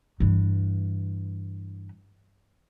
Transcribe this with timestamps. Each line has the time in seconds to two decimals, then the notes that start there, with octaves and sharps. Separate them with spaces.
0.20 G2 E3